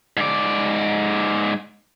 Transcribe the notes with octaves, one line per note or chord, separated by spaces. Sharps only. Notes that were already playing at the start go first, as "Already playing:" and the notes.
G#2 D5